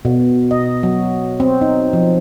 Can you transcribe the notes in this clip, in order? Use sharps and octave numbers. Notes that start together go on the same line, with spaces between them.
B2
D#5
F#3
C4
D#4
F3